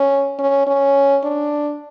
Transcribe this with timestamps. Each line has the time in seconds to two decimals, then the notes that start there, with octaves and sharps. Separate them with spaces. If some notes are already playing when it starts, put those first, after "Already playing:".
Already playing: C#4
0.39 C#4
0.67 C#4
1.24 D4